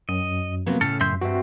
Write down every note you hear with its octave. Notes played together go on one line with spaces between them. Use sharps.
F#2 D#5
C3 F#3 A#3 B3
A2 C#3 A4 F6
F#2 E5 C6 G6
G2 C4 F#4 E5